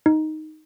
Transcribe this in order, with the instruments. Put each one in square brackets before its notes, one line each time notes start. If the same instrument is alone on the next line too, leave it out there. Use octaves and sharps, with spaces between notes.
[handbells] D#4